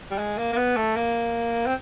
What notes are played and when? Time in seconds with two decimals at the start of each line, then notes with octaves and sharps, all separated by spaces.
0.11 G3
0.18 G#3
0.38 A#3
0.53 A#3
0.57 B3
0.76 A3
0.96 A#3
1.66 C4